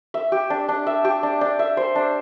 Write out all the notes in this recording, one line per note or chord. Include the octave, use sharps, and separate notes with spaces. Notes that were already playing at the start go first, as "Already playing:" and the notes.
E5
G4
D4
D4
E5
G4
D4
D4
E5
C5
D4